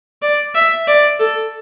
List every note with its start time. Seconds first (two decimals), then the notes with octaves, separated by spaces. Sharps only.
0.22 D5
0.55 E5
0.88 D5
1.20 A4